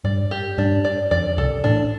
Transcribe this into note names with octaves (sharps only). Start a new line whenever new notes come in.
G2 G3 D5
G4
G2 G3 D4
D5
F2 F3 D5
C2 C3 A4
A1 A2 D4